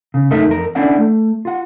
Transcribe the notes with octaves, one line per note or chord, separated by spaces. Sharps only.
C#3
F#2 A3 D#4 A#4 E5
F2 A#4
C#4 D4 E4 D5 F#5
A3
F4 F#5